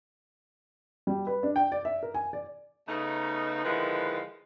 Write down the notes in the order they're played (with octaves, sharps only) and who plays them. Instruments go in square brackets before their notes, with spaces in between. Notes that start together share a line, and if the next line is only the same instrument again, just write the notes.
[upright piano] G3
B4
D4
G5
D5
E5
A#4
G#5
D5
[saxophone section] C#3 A3 B3 D#4
D3 D#3 F3 G#3 E4 B4